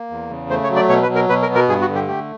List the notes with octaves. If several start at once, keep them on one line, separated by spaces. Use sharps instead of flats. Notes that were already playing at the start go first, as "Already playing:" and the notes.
Already playing: A#3
E2
C#3
A3 C5
C#5
F#3
D5
B2 C#5
B4
F#3
A#4
B2 B4
A#4
B3
A#4
G2 G#4
F#4
D3
G4
A3 G4